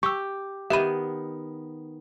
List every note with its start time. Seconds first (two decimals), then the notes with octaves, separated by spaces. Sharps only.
0.03 G4 C#6 E6
0.70 D#3 B3 G4 E5 B5 D#7